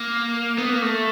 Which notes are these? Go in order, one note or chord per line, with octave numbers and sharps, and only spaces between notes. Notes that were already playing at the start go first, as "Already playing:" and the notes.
Already playing: A#3
B3
A#3
A3